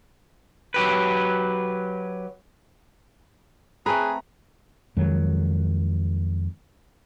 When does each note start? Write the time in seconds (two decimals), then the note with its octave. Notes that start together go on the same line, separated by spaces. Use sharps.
0.74 F#3 G4 B4
3.86 A3 C4 G#4 B4 A#5 F#6
4.97 F2 D#3 F#3 G#3